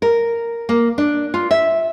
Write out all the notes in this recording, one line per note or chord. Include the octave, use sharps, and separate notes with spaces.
A#4
A#3
D4
F4
E5